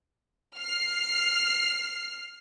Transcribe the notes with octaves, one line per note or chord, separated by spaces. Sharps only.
F6 C7